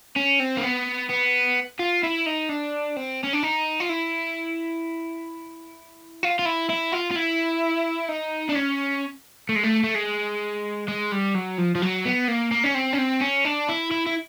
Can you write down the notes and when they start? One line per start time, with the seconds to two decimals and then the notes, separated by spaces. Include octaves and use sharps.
0.16 C#4
0.40 C4
0.57 A#3
0.63 B3
1.10 B3
1.79 F4
2.03 E4
2.26 D#4
2.49 D4
2.96 C4
3.23 C#4
3.33 D4
3.43 D#4
3.80 F4
3.89 E4
6.23 F4
6.39 F4
6.45 E4
6.69 E4
6.92 F4
7.10 F4
7.15 E4
8.08 D#4
8.49 D4
8.55 C#4
9.49 A3
9.55 G#3
9.63 A3
9.84 A3
9.95 G#3
10.88 G#3
11.12 G3
11.35 F#3
11.58 F3
11.75 F3
11.82 F#3
12.05 B3
12.28 A#3
12.52 A#3
12.64 C#4
12.75 C4
12.93 C#4
12.99 C4
13.21 C#4
13.45 D4
13.69 E4
13.91 E4
14.06 E4